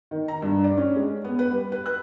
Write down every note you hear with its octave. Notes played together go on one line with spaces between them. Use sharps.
D#3
A#5
G2
D5
C#4
G#3
B3
B4
G3
B4
F#6